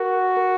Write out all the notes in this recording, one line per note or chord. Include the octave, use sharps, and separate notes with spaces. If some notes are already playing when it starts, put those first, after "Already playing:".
Already playing: F#4 A#4
A#4